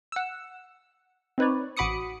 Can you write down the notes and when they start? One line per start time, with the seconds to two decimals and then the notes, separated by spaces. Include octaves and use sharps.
0.12 F#5 E6
1.38 C4 D#4 B4 C#5 D5
1.77 A1 F#4 B5 D6 D#6 C#7